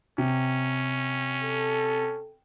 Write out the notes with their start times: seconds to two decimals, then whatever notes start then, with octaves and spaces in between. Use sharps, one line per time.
0.18 C3 C#4
1.43 A4